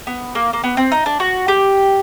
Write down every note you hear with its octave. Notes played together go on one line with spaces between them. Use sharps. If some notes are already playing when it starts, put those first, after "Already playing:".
B3
A#3
A#3
B3
C4
D#4
D4
F#4
G4